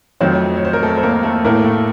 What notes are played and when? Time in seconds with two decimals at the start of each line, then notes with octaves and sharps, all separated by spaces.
0.21 F2 D#3 F#3 A3 C4 C5
0.57 C#5
0.65 C5
0.73 A#4
0.83 A3 A4
0.98 C5
1.03 A#3 A#4
1.23 A3 A4
1.45 A2 A3 A#3 A#4
1.64 A3 A4